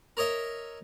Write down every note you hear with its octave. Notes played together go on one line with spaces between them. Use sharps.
A#4 C#5 D#5 E5